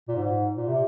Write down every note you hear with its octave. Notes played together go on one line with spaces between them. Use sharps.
A#2
G#2
A#2
C3